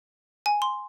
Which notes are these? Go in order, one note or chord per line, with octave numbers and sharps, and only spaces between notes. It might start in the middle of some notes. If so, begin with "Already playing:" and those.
G#5
C6